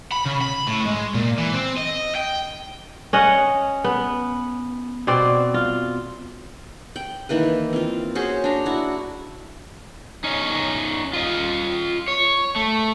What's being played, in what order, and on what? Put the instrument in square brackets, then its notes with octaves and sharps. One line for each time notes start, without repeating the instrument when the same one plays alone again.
[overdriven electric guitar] B5
C#3
B5
A2
G#3
A#2
E3
C4
D#5
G5
[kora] C#4 D#5 F#5
B3
B2 C4 D5
F4
[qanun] G5
D#3 E3 A#3 B4
C4 F4
C#4 F#4 G#4 C5
D4 A#5
E4 F#4
[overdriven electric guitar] C#4 D#4
F4 D#5
C#5
A3